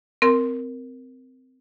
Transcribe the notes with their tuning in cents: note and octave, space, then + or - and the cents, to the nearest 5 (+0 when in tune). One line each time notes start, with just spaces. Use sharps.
C4 -20 A#4 +0 C6 +0